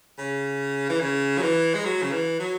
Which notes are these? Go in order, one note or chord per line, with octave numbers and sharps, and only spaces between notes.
C#3
E3
C#3
F#3
E3
G#3
F#3
C#3
E3
F#3